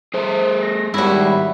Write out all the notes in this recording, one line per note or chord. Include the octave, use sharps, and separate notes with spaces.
A3 G#4 C5 E5
A#6
G#1 G#2 G3 E4 F#4 C#5 B5